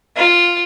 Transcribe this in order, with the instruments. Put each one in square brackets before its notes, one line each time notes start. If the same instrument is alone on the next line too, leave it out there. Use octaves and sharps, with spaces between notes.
[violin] F4